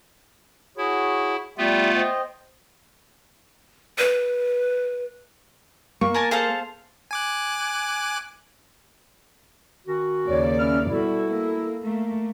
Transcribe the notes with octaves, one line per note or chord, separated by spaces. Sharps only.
E4 F#4 G#4 C#5
G3 A3 B3 F4 G4 E5
C5 D#5 G5
B4
A#3 C#6
A#4 G#5 A5
G#4 A4 C5 F5 A5
G#5 D6 F#6
D#3 C#4 F#4
D#2 C#3 C#5 D5
C#4 E4 F6
B2 G3 E4 F#4 A4
A#3
A3 A#3